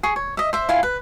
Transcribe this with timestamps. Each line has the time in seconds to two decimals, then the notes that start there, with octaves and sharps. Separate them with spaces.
0.03 G#4 C#6
0.16 C#5
0.37 D#5 E5
0.53 C5 E5
0.69 E4 F4 F5 G#5
0.83 B4